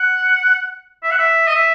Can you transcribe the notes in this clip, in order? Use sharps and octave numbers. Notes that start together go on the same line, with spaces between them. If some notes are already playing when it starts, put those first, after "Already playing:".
Already playing: F#5
E5
F#5
E5
D#5
E5